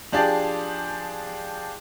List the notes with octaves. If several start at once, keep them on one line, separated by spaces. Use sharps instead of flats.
F3 D4 G4 G#4 D5